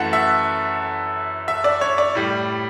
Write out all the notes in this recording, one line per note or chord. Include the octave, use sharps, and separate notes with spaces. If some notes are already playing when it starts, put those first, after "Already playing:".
Already playing: F#2 E3 A3 F#5 A5
E5
E5
D5
C#5
D5
A2 G3